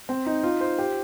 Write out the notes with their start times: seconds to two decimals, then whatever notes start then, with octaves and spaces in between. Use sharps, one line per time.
0.09 C4
0.26 D#4
0.43 F4
0.61 C5
0.79 G4